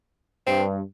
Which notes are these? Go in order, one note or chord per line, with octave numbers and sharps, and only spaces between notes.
G2 C4